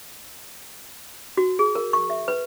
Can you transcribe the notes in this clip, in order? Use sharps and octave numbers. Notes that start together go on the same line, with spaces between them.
F#4
G#4
A#4
C#6
E5
B4